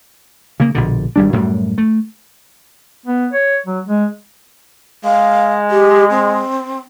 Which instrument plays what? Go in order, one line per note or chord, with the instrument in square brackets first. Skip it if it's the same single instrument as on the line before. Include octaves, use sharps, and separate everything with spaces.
[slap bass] C#3 A#3
A#1 B2 D3
G#1 G3 D4
F#2 A2 F#3 G3
A3
[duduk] B3
C#5
F#3
G#3
[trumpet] G#3 [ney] F5
[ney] G4
C4